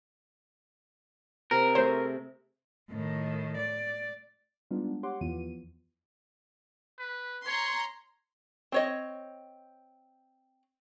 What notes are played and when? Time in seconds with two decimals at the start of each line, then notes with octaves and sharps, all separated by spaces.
1.51 C3 A#4
1.75 A3 G#4 C5
2.90 A2 D#3
3.58 D5
4.71 G3 G#3 B3 D4 D#4 F4
5.03 G4 C#5 F#5 C6 D6
5.21 E2 E3 F3 B3 F4 D#7
6.99 B4
7.46 C#5 A#5 C6
8.72 C4 C#5 D#5